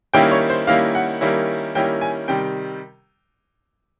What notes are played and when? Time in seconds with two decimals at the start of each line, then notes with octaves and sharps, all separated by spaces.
0.14 D#3 G3 A#3 C#4 E4 G5
0.31 C#5
0.50 C5
0.67 D#3 G3 A#3 C#4 E4 F5
0.95 F#5
1.21 D#3 G3 A#3 C#4 E4
1.75 D#3 G3 A#3 C#4 E4 G5
2.01 G#5
2.28 C3 D#3 G3 G5